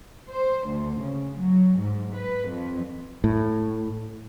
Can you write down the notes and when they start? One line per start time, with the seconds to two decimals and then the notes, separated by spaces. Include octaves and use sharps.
0.28 C5
0.68 D2
1.01 C#3
1.38 F#3
1.78 G#2
2.15 B4
2.49 F2
3.24 A2